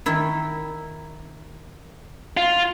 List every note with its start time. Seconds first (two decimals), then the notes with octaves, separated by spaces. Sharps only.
0.06 D#3 E4
2.37 F4